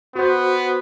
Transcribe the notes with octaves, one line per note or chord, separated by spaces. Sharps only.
B3 F#4 C5